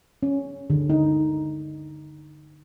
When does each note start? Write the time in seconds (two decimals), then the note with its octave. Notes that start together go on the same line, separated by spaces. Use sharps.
0.23 C#4
0.70 D3
0.90 D#4